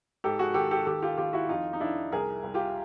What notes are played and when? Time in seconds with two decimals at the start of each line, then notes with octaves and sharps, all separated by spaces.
0.24 G#2 G4 A4
0.39 F#4 G#4
0.54 D#3 G4 A4
0.71 G4 A4
0.86 D#2 G4 A4
1.02 F4 G4
1.17 D#2 F4 G4
1.33 E4 F#4
1.49 F2 D#4 F4
1.73 D#4
1.80 F2 D4 E4
2.12 C2 G#4 A#4
2.43 C2
2.54 F4 G4